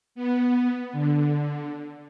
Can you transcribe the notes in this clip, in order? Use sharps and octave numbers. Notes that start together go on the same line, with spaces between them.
B3
D3